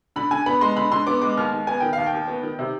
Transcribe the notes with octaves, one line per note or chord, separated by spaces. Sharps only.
D3 B5
D3 G#5
B3 B5
G#3 C6
D3 B5
D3 C6
B3 D6
G#3 D6
D#2 F6
D#2
B3 G#5
D#3 G5
D#2 F5
G5
D#2
B3
D#3
C3